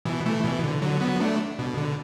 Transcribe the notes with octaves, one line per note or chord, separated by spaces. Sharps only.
B2 E3
E3 A3
B2 E3
D3
D3 F#3
F#3 B3
A3 D4
B2
D3